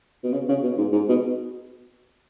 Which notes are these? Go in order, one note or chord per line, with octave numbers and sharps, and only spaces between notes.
B2
C#3
C#3
B2
G#2
G#2
B2